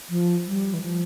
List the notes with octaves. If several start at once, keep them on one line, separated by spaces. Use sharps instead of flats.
F3
G3
E3
F3